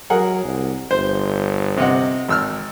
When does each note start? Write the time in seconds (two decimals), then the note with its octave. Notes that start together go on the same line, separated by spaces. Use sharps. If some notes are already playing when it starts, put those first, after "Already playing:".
0.10 F#3 G#4 A#4 F#5
0.44 C2
0.91 G1 C5
1.77 C3 D#5 F#5
2.29 G#1 E6 F6